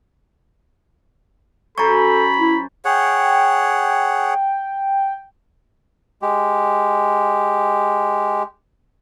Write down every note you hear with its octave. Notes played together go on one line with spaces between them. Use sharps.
F#2 A4 C5 A#5 B5 C#6
E4
G#4 C#5 F#5 G5
G#3 G4